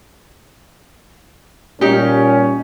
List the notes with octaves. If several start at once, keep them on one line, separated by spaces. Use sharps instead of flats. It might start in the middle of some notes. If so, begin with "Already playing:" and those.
A#2 G3 C#4 D#4 G4